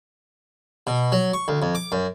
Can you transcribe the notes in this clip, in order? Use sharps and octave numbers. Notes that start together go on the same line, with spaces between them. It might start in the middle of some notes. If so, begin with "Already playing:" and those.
B2
F#3
C#6
D2
F2
D6
F#2